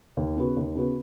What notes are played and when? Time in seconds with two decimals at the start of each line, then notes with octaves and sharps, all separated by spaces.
0.17 D#2
0.37 C#3 B3 F#4
0.57 D#2
0.75 C#3 B3 F#4